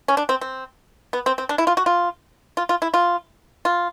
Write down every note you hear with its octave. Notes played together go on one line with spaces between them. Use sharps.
C#4
D4
C4
C4
B3
C4
C4
D4
E4
F4
F#4
F4
F4
F4
E4
F4
F4